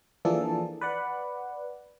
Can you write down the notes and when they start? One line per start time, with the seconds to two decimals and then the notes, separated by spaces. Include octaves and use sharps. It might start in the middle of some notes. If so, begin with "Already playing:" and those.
0.25 E3 F3 A#3 D4 G#4 A4
0.81 B4 D5 F#5